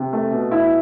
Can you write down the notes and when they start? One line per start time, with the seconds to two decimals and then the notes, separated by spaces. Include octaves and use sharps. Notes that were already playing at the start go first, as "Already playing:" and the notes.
Already playing: C3
0.13 A3
0.31 B2
0.51 E4